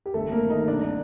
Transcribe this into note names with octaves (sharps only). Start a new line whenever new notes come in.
G4
G1 A3 A4
A#3 A#4
D#3
D#4 D#5
C2 D4 D5